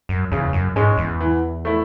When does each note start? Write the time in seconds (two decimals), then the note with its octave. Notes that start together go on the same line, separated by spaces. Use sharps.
0.09 F#2
0.32 E2 C#3
0.53 F#2
0.76 G#2 G#3 C#4
0.98 E2
1.20 E3
1.65 A3 E4